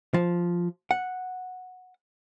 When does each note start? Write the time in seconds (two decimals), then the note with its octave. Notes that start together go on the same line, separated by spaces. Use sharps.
0.14 F3
0.91 F#5